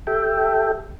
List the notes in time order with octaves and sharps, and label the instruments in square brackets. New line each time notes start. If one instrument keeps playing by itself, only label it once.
[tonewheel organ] G4 A4 E5 G5